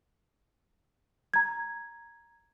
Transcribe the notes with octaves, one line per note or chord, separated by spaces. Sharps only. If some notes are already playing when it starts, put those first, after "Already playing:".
A#5 G#6